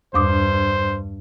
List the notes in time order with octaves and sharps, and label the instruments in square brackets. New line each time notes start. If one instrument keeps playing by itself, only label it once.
[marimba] E2 D6 D#6 [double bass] G2 [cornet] C5